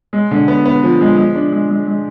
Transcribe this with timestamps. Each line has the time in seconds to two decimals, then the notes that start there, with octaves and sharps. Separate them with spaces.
0.13 G#3
0.31 D3
0.48 B3
0.65 B3
0.83 F3
1.01 G#3
1.17 G#3
1.35 D4
1.52 G#3
1.70 G#3
1.87 G#3